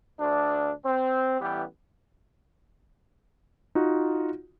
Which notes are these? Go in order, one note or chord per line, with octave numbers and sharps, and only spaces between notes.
D2 D4
C4
A1 E3 G3 B3 G4
D#4 F4 F#4